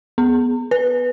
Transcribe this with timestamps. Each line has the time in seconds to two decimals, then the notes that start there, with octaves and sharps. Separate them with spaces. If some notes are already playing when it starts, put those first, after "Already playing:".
0.18 B3
0.71 B4